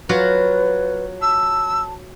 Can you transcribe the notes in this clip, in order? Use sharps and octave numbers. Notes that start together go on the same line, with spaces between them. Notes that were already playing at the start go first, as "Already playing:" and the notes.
F#3 F4 F#4 B4
A5 E6